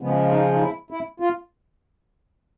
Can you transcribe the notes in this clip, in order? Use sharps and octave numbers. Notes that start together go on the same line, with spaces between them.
C#3 F3 G#3 B3
D#4
D#4
E4
E4
F4